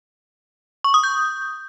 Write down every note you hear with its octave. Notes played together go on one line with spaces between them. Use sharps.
C#6
D#6
G6